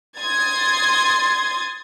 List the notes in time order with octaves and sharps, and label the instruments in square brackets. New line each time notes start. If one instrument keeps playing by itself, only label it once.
[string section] C6 D#6 G#6 A6